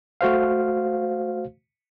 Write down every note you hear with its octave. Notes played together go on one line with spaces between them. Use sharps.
A3 F#4 C5 F5